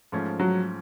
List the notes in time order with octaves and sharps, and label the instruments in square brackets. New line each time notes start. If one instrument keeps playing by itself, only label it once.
[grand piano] G#2 F3 A3 C#4
[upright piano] F#3